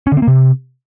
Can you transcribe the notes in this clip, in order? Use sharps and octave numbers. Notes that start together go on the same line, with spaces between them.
C#4
D3
C4
A#3
C3